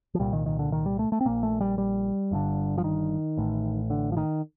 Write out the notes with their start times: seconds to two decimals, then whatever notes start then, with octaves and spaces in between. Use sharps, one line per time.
0.15 F3
0.19 C2 A#2 G3
0.33 D#3
0.46 D#3
0.59 D3
0.72 D#3
0.86 G3
0.99 A3
1.12 A3
1.21 C4
1.25 A#1 A#2 A#3
1.43 A3
1.61 G3
1.78 G3
2.31 G1 G2 D3
2.78 F3
2.84 D#3
3.37 A1 A2
3.90 D3
4.12 F3
4.17 D#3